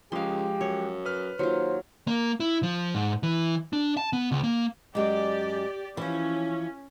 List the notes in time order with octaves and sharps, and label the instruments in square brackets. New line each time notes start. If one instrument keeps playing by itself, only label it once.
[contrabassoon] C#2 [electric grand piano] F3 G#3 [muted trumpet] G4 [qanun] F5 C6
[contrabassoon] F#2 [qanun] C#5
[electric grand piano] B4 F6
[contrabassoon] D#2 [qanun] F#3 F4 [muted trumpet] C5
[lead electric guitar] A#3
E4
F3
G#2
E3
D4
A5
B3
C#2
A#3
[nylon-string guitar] F#2 G#3 [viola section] G4 D5
[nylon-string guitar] E3 F3 [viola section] C#4